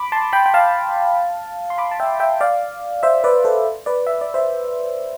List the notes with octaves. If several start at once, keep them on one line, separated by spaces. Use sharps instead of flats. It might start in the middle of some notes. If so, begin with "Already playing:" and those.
Already playing: B5 D6
A5 C6
G5 B5
G5
F5 A5
C6
B5 D6
A5
E5 G5
E5 G5
D5 F5
C5 E5
B4 D5
A4 C5
B4 D5
E5
D5
C5 E5